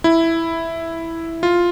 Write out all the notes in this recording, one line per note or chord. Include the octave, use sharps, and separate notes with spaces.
E4
F4